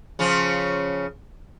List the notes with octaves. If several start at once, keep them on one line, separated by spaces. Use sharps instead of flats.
C#3 F3 C#4